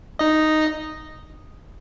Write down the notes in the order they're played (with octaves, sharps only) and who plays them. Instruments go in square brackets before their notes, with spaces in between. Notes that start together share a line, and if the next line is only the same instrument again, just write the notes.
[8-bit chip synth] D#4 D#5